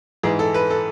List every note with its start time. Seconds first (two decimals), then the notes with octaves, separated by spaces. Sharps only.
0.23 G#2 E3 G#4
0.39 A4
0.54 B4
0.70 A4